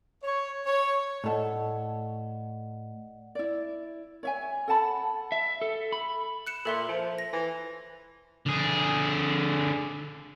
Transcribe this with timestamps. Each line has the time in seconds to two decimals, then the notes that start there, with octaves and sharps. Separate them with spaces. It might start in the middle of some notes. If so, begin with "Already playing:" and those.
0.23 C#5
0.66 C#5
1.24 A2 A4 D5 D#5 F#5
3.35 E4 D5
4.23 C#5 E5 G#5
4.68 A4 F#5 A5 B5
5.32 E5
5.62 A4
5.92 B5
6.47 F#6 C#7 E7
6.65 A#2 A4 E5 C6
6.89 F3
7.18 A#6
7.33 E3
8.46 D3 G#4